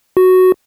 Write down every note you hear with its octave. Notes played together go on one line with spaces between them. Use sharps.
F#4